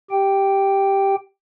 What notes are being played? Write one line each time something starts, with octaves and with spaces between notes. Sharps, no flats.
G4 G5